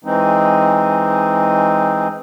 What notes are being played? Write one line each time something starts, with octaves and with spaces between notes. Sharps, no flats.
E3 G#3 C4 D#4